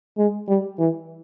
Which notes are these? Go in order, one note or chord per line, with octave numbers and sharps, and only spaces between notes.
G#3
G3
E3